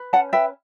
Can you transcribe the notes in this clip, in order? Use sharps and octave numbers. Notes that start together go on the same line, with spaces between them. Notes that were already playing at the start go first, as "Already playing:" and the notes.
Already playing: B4
C#4 F#5 A5
B4 E5 G5